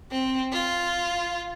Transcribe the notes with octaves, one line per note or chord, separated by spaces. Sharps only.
C4
F4